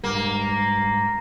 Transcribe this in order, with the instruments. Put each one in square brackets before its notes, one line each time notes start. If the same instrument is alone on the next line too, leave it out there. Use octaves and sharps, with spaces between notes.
[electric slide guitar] G#2 G3 [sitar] A#3